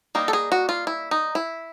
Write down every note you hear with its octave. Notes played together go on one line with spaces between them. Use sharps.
G3 A#3 D#4
A4
G#4
F#4
F4
E4
D#4
E4